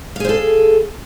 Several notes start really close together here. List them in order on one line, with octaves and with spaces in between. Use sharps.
F5 G#4 C5 A4